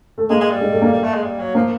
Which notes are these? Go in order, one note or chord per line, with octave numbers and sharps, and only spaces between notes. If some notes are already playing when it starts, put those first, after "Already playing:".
A3
G#3 A#3
G#3
G3
G#3
A3
A#3
G3
A3
G#3
G3
F#3
F3 A#3